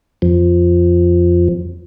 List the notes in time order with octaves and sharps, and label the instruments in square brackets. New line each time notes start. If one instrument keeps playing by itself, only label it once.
[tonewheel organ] F2 F3